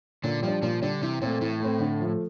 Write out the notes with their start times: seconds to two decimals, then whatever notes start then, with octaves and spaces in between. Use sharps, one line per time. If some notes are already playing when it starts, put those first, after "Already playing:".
0.24 A#2 D3
0.43 F3 G3 D4
0.62 A#2 F3
0.82 D3 G3 D4
1.02 C3 E3
1.21 A#2 A3 C4
1.41 A2 E3
1.60 A3 C4
1.80 D3
2.00 F3 A3